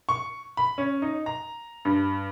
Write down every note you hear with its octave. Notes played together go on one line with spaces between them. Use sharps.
C#6
B5
C#4
D#4
A#5
G2